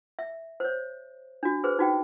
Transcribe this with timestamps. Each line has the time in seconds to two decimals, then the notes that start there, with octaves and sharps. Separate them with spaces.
0.19 E5
0.60 C5 C#5
1.43 D4 F#4
1.64 G#4 B4 C5
1.79 D#4 F#4 G5